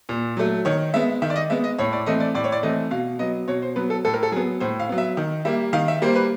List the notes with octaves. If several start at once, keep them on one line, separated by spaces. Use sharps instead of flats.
A#2
F#3 A3
D#3 C#5
G#3 B3 E5
D#3 E5
D5
D#5
G#3 B3 E5
D#5
A2 C#5
D5
E3 A3 C4 D#5
D5
A2 D5
C#5
D5
E3 A3 C4 D#5
B2 F5
F#3 B3 D#5
B2 C#5
C5
F#3 B3 B4
A4
A2 A4
A#4
A4
F#3 B3 G#4
A2 C5
F5
F#3 B3
E5
D#3
G3 A#3 E5
D#3 F5
E5
G3 A#3 C5
B4